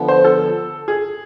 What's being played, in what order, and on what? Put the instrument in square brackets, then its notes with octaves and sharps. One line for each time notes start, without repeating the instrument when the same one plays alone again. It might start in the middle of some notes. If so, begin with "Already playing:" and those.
Already playing: [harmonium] D3 F3 B3
[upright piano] C5
A4
G#4